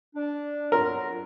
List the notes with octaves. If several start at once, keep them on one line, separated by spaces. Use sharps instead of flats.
D4
F#3 F4 A#4